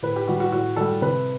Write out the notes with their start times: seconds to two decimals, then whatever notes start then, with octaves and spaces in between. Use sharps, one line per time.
0.03 A2 B4
0.16 G4
0.28 E3 G3 F#4
0.40 F#4
0.52 A2 F#4
0.76 E3 G3 A4
1.02 C3 B4